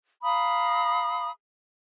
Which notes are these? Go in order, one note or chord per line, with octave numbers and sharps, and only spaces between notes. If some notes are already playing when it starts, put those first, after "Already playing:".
F5 A#5 B5 D#6